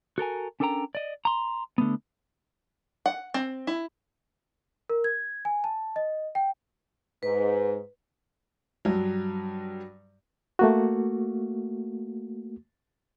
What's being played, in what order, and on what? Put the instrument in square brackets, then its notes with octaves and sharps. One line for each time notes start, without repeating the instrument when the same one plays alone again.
[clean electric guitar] F#4 A4 A#4 G#5
C#4 D4 A4 A#4 G5 A#5
D5 D#5
A#5 C6
D3 A3 B3
[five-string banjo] F#5
C4
E4
[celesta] A#4
G#6
G#5
A5
D#5
G5
[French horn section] G#2 [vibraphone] B4
[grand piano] G2 F#3
[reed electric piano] A3 A#3 F#4